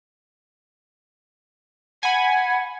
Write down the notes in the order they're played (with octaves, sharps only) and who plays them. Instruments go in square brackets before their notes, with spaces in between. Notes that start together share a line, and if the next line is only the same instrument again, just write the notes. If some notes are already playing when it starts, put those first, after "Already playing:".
[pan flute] F#5 [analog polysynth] G#5 B5